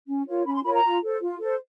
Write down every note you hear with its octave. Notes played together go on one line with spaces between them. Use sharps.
C#4
F4 A#4 C#5
C#4 B5
C6
F4 A#4 C#5 B5
A#5
F4
A4 C5
F4
A4 C5